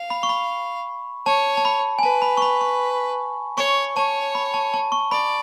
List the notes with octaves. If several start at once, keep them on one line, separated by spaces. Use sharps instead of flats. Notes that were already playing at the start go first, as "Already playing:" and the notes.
Already playing: F5
B5
C#6
B5
C#5 A5
A5
B5
G#5
B4 A5
B5
C#6
B5
C#6
C#5 C#6
C#5 A5
B5
A5
A5
C#6
D5 B5